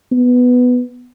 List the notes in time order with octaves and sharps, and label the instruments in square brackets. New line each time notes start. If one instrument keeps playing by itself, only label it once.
[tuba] B3